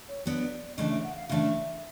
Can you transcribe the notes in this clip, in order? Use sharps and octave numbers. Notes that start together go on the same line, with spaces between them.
C#5
F#3 B3 D4 D5
C#3 E3 A3 D4 D#5
E5
F#5
F5
C#3 E3 A3 D4 E5